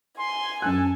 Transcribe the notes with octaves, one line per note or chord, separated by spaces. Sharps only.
G#5 C6
F#2 A4 F#6